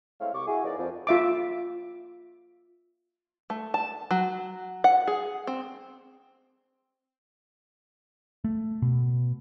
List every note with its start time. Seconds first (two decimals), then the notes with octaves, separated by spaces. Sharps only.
0.20 G#3 A3 C4 E4 C#5 F5
0.33 C2 C3 C#6 D6
0.47 E4 F#4 G#4
0.64 E3 A#3 C#4 D#4 D5
0.78 F2
1.07 F4 E5 D6
3.50 A3
3.74 A5
4.11 F#3
4.84 F#5
5.07 G#4
5.47 C4
8.44 A3
8.82 B2